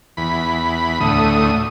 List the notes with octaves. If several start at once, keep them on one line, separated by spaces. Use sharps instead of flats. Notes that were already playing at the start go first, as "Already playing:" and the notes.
E2 B5
D2 A2 D#6